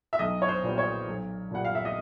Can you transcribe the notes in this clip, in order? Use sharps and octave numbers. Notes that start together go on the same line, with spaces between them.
E5
B1 D#5
C#5
C5
A#2 G3 B3
C#5
B1
A#2 G3 F#5
F5
E5
D#5